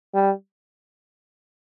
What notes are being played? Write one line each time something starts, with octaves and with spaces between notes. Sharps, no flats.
G3